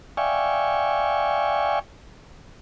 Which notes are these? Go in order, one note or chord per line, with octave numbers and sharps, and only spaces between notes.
D5 E5 F5 G5 G#5 C#6